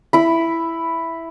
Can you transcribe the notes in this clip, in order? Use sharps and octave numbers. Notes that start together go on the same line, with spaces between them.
E4 B5